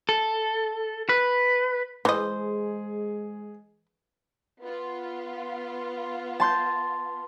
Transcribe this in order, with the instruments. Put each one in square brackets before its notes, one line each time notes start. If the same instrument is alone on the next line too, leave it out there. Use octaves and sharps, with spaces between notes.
[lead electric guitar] A4
B4
[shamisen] E3 D#5 [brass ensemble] G#3 G#4 [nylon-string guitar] C5
[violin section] B3 F4
[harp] A5 C6 G6